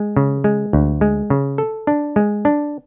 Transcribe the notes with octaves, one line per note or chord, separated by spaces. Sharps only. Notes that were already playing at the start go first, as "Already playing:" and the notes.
Already playing: G#3
C#3
G#3
D2
G#3
C#3
A4
D4
G#3
D4